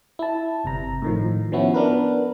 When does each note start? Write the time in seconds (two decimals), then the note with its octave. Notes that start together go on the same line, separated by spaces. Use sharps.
0.19 E4 A5
0.64 G1 C3 A#5
1.02 A2 D#3 F3
1.52 F3 B3 C#4 E4 F#4
1.74 B3 D4 A#4 B4